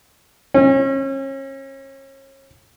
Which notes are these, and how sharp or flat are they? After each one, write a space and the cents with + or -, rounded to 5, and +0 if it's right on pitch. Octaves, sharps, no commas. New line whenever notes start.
C#4 -35